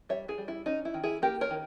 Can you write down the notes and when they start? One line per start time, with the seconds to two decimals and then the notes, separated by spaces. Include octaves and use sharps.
0.09 G3 C#5 E5
0.28 E4 G#4
0.38 G3
0.48 E4
0.66 C#4 D#4
0.85 E4
0.94 D#3
1.03 E4 G#4
1.22 A#3 G4 A#4
1.41 A#4 C#5
1.50 D#3